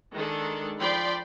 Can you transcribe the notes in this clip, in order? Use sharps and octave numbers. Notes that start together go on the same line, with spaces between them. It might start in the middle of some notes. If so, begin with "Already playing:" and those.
D#3 G#3 D4 A4
F3 D5 G5 B5 C6